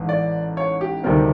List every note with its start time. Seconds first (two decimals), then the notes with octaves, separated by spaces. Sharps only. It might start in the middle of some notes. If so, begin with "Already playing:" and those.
Already playing: A1 G#2 E3
0.09 D5
0.57 C#5
0.81 G4
1.03 D2 C3 D#3 G3 C4 A#4